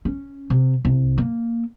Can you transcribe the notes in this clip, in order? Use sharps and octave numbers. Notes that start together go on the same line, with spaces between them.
C#4
C3
C2
A#3